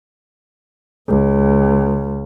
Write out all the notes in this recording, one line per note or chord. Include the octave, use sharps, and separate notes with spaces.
C#2